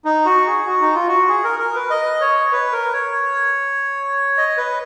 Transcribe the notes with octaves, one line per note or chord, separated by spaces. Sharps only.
D#4
F#4
G#4
F#4
D#4
F4
F#4
G#4
A#4
A#4
B4
D#5
C#5
B4
A#4
C#5
D#5
B4